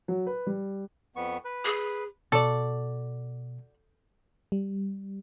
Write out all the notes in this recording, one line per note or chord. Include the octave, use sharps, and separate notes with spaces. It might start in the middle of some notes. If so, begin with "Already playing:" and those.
F#3
B4
G3
F2 B3 C#6
B4
G#4
B2 F#4 A4 D5
G3